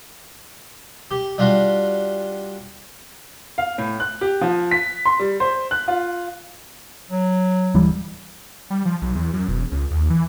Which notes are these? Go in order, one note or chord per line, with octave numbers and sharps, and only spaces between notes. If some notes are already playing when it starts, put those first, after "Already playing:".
G4
G3 D4 F4 F#4
F5
A2
F#6
G4
F3
B6
C6
G3
C5
F#6
F4
F#3
D1 E3 G3
G3
F3
B1
E2
F#2
E1
C#2
D#2
E3